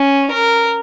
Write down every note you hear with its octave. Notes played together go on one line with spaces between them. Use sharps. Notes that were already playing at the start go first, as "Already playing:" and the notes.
Already playing: C#4
A#4